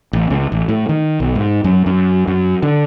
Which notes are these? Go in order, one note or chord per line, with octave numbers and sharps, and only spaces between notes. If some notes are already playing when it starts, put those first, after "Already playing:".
A1
C#2
A1
A2
D#3
B1
G#2
F#2
F#2
F#2
D3